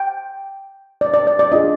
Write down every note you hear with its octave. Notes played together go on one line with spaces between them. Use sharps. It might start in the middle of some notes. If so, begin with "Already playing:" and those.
Already playing: G5
D5
D5
D5
D5
D4 F4 G#4 D#5